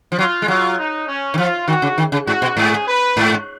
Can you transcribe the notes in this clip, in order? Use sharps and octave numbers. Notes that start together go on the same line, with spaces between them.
F3
F#3 F4
G#3
F#3 F4
D#4
C#4
D#3
F3 F4
D#3 F#4
C#3
D#3
C#3
G#2 F#4
B2
G#2 G#4
B4
G#2